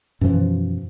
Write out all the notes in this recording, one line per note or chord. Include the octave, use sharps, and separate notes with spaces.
F#2 B2 E3 F3